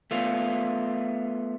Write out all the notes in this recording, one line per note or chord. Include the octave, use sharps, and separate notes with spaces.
A3 B3 F4